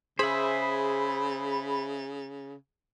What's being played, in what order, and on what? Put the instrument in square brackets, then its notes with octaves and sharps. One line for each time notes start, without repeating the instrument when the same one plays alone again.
[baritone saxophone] C#3 [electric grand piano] G#4 [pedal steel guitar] C5 E5 [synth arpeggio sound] B5